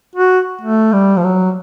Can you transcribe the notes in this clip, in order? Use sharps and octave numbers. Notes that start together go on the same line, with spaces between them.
F#4
A3
G3
F3
F#3